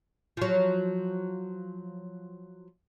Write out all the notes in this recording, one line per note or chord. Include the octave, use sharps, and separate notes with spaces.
F3 F#3